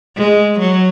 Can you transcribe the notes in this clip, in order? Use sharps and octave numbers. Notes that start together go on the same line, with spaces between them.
G#3
F#3